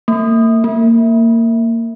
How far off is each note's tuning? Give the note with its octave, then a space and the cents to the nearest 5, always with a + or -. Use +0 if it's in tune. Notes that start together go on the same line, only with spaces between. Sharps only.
A#3 -40
A#3 -20